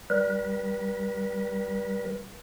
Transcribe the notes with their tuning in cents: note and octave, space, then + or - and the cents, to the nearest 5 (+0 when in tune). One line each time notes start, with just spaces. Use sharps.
G3 -10 B4 -40